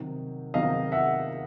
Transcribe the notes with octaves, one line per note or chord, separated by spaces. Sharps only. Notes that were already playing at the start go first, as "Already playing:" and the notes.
Already playing: C3 D#3 F#3
C3 D#3 F#3 D#5 F5
E5 F#5